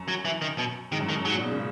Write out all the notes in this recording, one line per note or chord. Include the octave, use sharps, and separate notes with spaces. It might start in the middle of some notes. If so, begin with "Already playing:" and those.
Already playing: F#2
F#3
E3
D#3
B2
G#2 D#3
F#2
G#2 D#3
F#2
G#2 F#3
A#2
B2
C#3